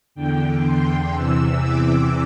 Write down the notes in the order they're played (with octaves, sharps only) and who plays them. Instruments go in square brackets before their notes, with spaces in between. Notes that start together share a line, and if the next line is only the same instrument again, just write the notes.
[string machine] E2 D3 G5
C6
E2 C3 E3 E6
D6